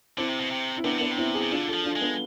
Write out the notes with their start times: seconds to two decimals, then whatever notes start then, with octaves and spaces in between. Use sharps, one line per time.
0.18 D3 C4 E4
0.29 C3
0.40 B2
0.51 C3
0.78 E4
0.84 C3 B3 D4
0.98 D3 B3 D4
1.11 C3
1.18 C4 E4
1.34 E4 G#4
1.42 C3
1.51 D3 D4 F4
1.68 F4 A4
1.73 F3
1.84 D4 F4
1.96 G#3
2.01 B3 D4